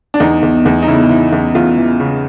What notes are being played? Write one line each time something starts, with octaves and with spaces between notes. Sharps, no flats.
D4
E2 D#4
E2
E2
D#4
C#3 E4
E3
E2
E2 F4
E3
C#3